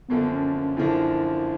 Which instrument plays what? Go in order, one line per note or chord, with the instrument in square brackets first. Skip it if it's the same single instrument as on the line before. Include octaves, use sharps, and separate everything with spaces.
[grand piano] F#2 D3 F3 A#3 D4 [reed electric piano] B3
[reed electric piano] C#4
C#4
[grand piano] F#2 D3 F3 A#3 D4 [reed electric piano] E4